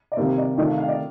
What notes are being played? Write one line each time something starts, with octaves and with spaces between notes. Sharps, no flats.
D5
C3 D#3 G3 A#3 C5
D5
C3 D#3 A3 D#4 D5
F5
F5
D5